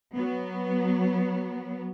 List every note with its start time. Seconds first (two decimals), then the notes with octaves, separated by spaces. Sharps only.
0.16 F#3 B3